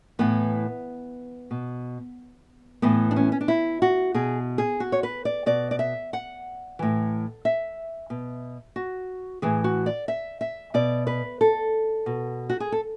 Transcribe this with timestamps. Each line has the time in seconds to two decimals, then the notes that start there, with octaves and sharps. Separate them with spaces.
0.19 A2 E3 B3
1.51 B2
2.82 A2 E3 B3
3.11 D4
3.16 C#4
3.32 C#4
3.41 D4
3.48 E4
3.82 F#4
4.14 B2 G#4
4.58 G#4
4.80 F#4
4.92 C#5
5.03 B4
5.25 D5
5.46 B2 D5
5.71 D5
5.79 E5
6.13 F#5
6.79 A2 E3
7.45 E5
8.10 B2
8.76 F#4
9.42 A2 E3 G#4
9.64 F#4
9.86 D5
10.08 E5
10.41 E5
10.74 B2 D5
11.07 B4
11.41 A4
12.06 B2
12.49 F#4
12.60 G#4
12.72 A4